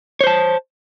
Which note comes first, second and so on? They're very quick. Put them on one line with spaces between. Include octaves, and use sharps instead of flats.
C#5 C5 A5